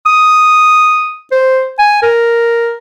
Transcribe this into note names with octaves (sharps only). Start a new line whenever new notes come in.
D#6
C5
G#5
A#4